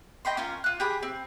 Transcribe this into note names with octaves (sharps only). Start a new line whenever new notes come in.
D#5 G5 B5 C6
C#4 F4 A#4
F4 F#6
G4 G#4 B5
C4